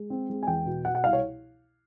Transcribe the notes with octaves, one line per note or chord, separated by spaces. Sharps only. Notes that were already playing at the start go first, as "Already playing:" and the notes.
Already playing: G#3
C4
G#3
G#5
E2 G5
B2
B2 F#5
F#5
C2 F5
C#5